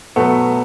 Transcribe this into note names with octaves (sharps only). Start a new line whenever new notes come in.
B2 F#3 A3 B3